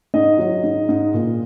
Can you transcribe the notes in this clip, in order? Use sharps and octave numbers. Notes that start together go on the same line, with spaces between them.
G#2 D#5
F#3
G#2
G#2
A#2